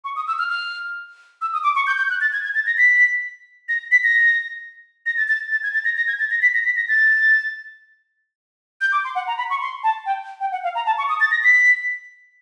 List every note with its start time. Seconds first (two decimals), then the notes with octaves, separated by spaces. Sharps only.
0.04 C#6
0.16 D#6
0.27 E6
0.39 F6
0.50 F6
1.42 E6
1.53 D#6
1.64 D6
1.76 C#6
1.87 G6
1.98 G6
2.10 F#6
2.21 A6
2.33 G#6
2.44 G#6
2.55 A6
2.66 A#6
2.78 B6
3.69 A#6
3.91 B6
4.04 A#6
5.06 A#6
5.17 A6
5.28 A6
5.51 A6
5.63 G#6
5.74 A6
5.85 A#6
5.97 A#6
6.08 G#6
6.19 A6
6.31 A#6
6.42 B6
6.54 A#6
6.65 B6
6.76 A#6
6.88 A6
8.81 G6
8.92 D6
9.04 C6
9.15 F#5
9.27 A#5
9.38 B5
9.50 C#6
9.62 C6
9.84 A5
10.06 G5
10.41 G5
10.52 F#5
10.64 F5
10.75 A#5
10.86 A5
10.98 C#6
11.09 D#6
11.20 A6
11.31 A#6
11.44 B6